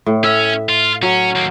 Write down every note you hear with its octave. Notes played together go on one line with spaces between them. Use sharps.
A2
C#4 E5
F4
F#3 C#4
D#2 A#3